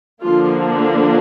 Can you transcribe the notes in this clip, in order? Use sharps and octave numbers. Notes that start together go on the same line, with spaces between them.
D3 F3 A#3 D4 F4